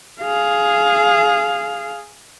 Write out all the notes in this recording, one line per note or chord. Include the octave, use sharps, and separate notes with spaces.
G#4 F5